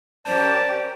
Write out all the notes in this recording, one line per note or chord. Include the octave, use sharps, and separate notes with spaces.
C#4 G4 A#4 C5 D5 A5